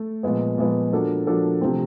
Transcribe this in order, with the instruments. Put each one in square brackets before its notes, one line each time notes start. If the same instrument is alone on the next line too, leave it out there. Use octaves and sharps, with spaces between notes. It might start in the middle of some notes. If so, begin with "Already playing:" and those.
Already playing: [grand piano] A3
A#2 F3 G#3 B3
A#2 F3 G#3 B3
F3 A#3 D4 F#4 A4
F3 A#3 D4 F#4 A4
C3 F3 A3 C4